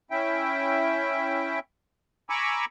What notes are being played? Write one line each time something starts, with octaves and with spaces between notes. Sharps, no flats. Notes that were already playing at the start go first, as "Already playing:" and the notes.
C#4 E4 E5 G5
G#5 A#5 B5 C#6 D6 E6